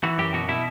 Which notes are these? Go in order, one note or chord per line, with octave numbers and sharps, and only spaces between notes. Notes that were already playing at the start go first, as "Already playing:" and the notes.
E3 F#4
F#2 G4
B2 F#4
B2 E4